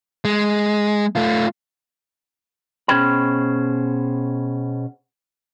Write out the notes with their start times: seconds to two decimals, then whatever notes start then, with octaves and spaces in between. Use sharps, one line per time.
0.25 G#3
1.15 A3 F4
2.88 B2 C#4 G#4 C5 G5 B5